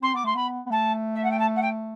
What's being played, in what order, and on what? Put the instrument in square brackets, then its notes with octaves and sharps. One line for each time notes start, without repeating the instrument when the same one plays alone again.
[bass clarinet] C4 [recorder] C6
[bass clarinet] B3 [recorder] D6
[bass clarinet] A3 [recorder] C6
[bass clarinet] B3 [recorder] B5
[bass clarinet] B3
[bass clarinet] A3 [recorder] A5
[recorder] E5
F#5
G5
A5
F#5
G5